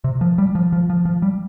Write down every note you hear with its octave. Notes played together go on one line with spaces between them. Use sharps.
C3
F3
G3
F3
F3
F3
F3
G3